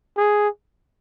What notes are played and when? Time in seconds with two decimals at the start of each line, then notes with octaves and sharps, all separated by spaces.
0.17 G#4